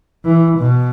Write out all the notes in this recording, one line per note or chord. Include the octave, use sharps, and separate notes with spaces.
E3
B2